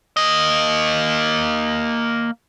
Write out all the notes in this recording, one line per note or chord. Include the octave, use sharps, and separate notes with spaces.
A#3 D#5